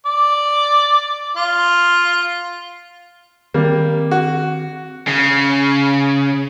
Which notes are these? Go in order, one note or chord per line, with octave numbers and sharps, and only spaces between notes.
D5
F4
D#3 G3 A#3 C4
F#4
C#3